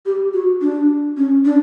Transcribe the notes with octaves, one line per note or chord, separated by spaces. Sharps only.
G4
F#4
D4
C#4
D4